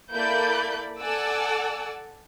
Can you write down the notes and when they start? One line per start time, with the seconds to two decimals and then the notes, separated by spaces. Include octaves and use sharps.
0.13 A#3 E4 A4 D5 B5 G6
0.99 A4 D5 F#5 G#5 D6 E6